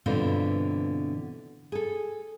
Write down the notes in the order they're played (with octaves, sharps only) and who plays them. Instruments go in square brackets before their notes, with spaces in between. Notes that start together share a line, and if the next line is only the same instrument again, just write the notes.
[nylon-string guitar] G2 B2 D3 E3 C4 F4
G#4 A4